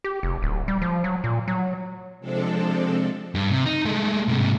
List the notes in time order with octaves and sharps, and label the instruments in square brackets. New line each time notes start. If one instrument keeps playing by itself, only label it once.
[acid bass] G4
F1
D1
G3
F3
F#3
A#2
F#3
[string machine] C3 F3 G#3 C4 D4 A4
[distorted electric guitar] G2
C3
D#4
G#3 A3
G#2 C3